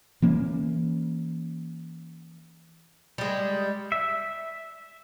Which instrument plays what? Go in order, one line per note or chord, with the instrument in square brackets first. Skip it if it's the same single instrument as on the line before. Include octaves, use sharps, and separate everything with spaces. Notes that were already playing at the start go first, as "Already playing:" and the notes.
[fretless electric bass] E3 A#3 C#4
[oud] G3 G#3
[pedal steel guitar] E5